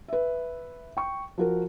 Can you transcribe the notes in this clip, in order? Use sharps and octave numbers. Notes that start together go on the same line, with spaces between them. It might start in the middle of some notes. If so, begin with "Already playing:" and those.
B4 E5
G5 C#6
F3 F#4 A#4